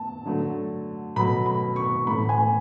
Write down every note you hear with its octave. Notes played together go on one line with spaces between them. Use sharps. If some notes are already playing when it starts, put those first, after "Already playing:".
Already playing: A3 A5
D3 F#3 A3
B2 F#3 A3 B5
B5
C#6
A2 E3 A3 B5
G#5